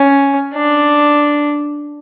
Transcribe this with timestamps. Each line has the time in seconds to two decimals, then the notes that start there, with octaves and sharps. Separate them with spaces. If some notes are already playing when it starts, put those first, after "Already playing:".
Already playing: C#4
0.55 D4